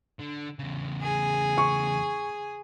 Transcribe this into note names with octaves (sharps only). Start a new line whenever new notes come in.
D3
E2 C#3
G#4
C#6